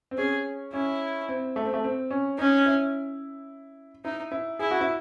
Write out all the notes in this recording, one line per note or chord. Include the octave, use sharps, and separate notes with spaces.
C4
C#4 G#4
C#4 E4
C4
A3
C4
A3
C4
C#4
C#4 D#4
E4
D#4 E4
E4
E4 G#4
F#4
E4